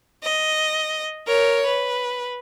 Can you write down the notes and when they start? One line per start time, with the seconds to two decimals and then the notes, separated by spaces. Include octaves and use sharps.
0.24 D#5
1.27 A#4 C#5
1.67 B4